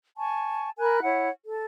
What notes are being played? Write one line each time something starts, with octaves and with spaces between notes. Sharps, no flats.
G#5 A5 C#6
A#4 G#5 B5 F#6
E4 C#5 F#5
A4